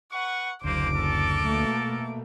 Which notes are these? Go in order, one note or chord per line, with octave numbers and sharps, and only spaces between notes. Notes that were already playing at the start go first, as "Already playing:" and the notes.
B4 F#5 C#6
F#1 D2 D3 A#3 C5 D6
A4 A#4 A5
B2 A3 A#3